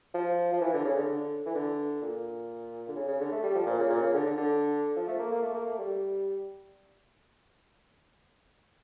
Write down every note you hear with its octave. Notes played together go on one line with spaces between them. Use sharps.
F3
F3
E3
D3
C#3
D3
D3
E3
D3
A#2
D3
C#3
C#3
D3
A3
G3
F3
A#2
C#3
A#2
C#3
D3
D3
D3
F3
A3
A#3
A#3
A3
A#3
A3
G3